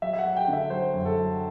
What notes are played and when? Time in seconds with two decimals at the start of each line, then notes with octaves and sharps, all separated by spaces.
0.02 F#3 E5
0.13 E5
0.19 F#5
0.25 F#3
0.37 G5
0.48 D3 E5
0.70 F#3 C5
0.94 F#2
1.05 A4
1.17 F#3